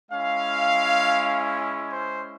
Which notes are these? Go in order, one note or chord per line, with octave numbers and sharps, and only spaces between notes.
G#3 C#4 E4 F5
C5